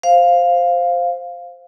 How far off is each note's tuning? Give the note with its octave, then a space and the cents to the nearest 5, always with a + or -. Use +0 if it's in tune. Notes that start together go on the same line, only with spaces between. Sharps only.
C5 +0 F5 +0